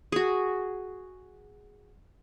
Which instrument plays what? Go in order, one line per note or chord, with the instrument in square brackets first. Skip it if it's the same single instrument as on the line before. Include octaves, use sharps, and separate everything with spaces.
[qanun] F#4 G#4